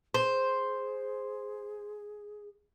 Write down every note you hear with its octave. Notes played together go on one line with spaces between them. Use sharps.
G#4 C5